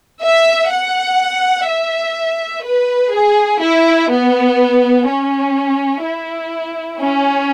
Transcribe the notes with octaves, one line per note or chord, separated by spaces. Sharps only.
E5
F#5
E5
B4
G#4
E4
B3
C#4
E4
C#4